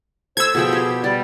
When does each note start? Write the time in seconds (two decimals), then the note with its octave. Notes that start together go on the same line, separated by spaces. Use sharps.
0.37 A4 C5 B5 E6 G#6
0.55 B2 F3 G#4 G5
0.72 G4
1.04 G3 D5